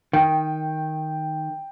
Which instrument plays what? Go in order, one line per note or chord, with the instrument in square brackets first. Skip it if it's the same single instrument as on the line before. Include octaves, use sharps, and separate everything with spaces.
[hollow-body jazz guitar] D#3 [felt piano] G5